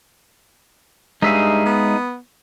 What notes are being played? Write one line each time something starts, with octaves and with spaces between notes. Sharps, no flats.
G2 G#3 D#4 G#4 E5 F5
B3